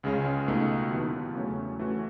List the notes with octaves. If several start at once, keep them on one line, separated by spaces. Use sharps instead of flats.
C#2 C#3 G#3 C#4
C#2 B2 A3 D#4
D#2 D#3 F#3 B3 E4
E2 C#3 F#3 A3 C#4
E3 A3 C#4 F#4